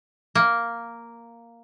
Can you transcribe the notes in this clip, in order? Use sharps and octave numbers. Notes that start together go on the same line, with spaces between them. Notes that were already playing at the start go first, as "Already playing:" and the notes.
A#3